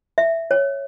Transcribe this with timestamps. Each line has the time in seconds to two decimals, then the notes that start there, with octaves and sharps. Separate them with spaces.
0.18 E5
0.51 C#5